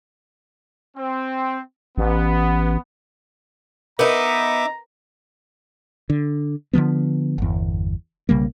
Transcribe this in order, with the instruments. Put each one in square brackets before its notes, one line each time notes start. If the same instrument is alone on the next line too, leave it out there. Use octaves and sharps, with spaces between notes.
[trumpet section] C4
[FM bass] A1 [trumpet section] B3
[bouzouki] B3 D#4 [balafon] A#4 B4 [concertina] E5 D6 [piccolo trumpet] A#5
[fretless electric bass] D3
D3 D#3 F3 B3
G1 E2
B1 C#3 G3 A#3